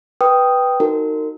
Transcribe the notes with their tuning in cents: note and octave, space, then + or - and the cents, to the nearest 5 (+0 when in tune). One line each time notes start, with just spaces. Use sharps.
B4 +0 G5 +0 D#6 +0
D#4 -5 F#4 -5 A#4 -30